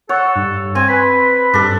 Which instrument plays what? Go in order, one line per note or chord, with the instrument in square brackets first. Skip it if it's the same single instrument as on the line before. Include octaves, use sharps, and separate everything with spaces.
[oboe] A4 [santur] C#5 [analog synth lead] F#5
[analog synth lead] G2
[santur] C4 [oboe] G#5
[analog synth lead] B4 [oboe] B5
[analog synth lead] G2 [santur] D4 A4